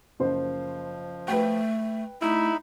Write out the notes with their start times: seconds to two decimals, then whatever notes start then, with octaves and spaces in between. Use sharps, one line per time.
0.20 F#1 F3 C5
1.28 A3 B4 G5
2.22 A3 D#4 E4 B5